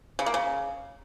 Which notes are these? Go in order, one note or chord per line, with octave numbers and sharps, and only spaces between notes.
C#3
A#3
C#3